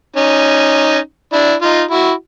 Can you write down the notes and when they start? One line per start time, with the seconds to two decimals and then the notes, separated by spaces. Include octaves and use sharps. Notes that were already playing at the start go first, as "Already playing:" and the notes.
0.16 C#4 D#4
1.33 D4 E4
1.62 D#4 F4
1.91 E4 F#4